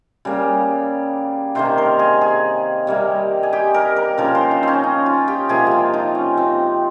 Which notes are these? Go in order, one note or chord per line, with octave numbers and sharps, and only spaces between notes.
C#3 G3 A#3
C3 D#3 A#3 C5
A#4
G#4
G#4
C3 G3 A#3
G#4
G4
A#4
A#4
C#3 F3 A#3 A#4
C5
D#4
C4 C#4
D#4
F4
G4
C3 F3 A#3 G#4
F4 G4
D#4
C#4
C4